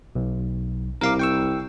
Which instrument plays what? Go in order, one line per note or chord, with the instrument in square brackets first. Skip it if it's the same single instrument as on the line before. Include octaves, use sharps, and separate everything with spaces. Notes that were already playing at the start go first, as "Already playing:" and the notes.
[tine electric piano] B1
[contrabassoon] C2 [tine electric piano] A#4 F5 D6
[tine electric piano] G5 C#6 E6